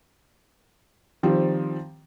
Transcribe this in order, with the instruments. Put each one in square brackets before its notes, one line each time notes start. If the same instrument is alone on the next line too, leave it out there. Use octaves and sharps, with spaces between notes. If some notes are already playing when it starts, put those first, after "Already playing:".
[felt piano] D#3 F3 G3 C4 C5